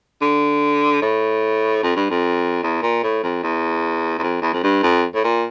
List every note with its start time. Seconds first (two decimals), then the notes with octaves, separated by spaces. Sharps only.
0.22 D3
1.02 A2
1.83 F2
1.96 G2
2.10 F2
2.63 E2
2.82 A#2
3.03 A2
3.23 F2
3.43 E2
4.19 E2
4.23 F2
4.42 E2
4.53 F2
4.63 G2
4.83 F2
5.15 A2
5.24 A#2